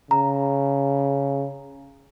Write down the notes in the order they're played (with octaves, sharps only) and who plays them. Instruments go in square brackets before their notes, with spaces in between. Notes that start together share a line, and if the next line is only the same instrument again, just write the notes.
[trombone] C#3 [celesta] A#5